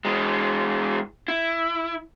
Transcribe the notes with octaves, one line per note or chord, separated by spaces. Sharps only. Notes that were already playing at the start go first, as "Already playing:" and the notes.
E3 G#3
E4